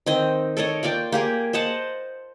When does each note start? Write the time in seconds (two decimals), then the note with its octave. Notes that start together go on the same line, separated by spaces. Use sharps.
0.06 D#3 C4 D#5
0.57 A4 A#4 C#5 D#5
0.83 A#3 F4 D5 G5
1.12 A#3 G4 G#4
1.53 C5 D#5 F#5 A5